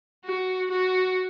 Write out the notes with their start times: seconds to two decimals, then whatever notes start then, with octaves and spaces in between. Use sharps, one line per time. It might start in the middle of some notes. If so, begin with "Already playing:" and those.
0.25 F#4
0.71 F#4